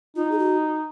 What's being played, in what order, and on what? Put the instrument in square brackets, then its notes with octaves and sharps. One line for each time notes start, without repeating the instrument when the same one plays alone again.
[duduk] D#4 [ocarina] F4
[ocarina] G#4
F#4